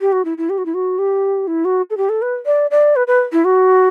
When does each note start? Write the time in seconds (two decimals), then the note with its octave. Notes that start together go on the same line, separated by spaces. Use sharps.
0.01 G4
0.12 F#4
0.25 E4
0.38 E4
0.49 G4
0.58 F#4
0.66 E4
0.74 F#4
0.99 G4
1.47 E4
1.65 F#4
1.90 A4
1.97 G4
2.09 A4
2.22 B4
2.46 D5
2.71 D5
2.96 B4
3.07 B4
3.32 E4
3.45 F#4